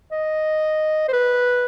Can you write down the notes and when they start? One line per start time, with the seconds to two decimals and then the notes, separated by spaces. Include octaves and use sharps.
0.12 D#5
1.09 C5
1.13 B4